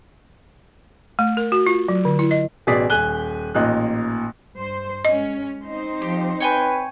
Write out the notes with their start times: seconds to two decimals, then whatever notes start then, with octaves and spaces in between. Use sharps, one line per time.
1.19 A3
1.37 A#4
1.52 F#4
1.67 F4
1.89 F#3
2.05 D3
2.19 E4
2.31 D#5
2.67 A1 B2 G#4 D5 B6
2.90 D#1 G#5 F#6 G7
3.55 A1 A#2 D#4 F#6
4.55 G2 C5
5.05 G#3 C#4 D#5
5.65 C4 D#4 C5
6.02 F3 G4
6.40 B4 C#5 G5 G#5